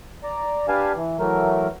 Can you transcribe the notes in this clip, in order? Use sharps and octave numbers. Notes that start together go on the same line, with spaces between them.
D5 A#5
D4 G4 B4 F5 G#5 A5
E3
E3 F#3 A3 A#4